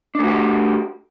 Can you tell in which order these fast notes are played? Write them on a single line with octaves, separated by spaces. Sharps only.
D4 A3 F#4 G4